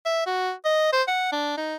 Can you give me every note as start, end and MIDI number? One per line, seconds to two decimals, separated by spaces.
0.06 0.23 76
0.26 0.52 66
0.65 0.91 75
0.93 1.02 72
1.08 1.27 78
1.32 1.56 62
1.57 1.77 63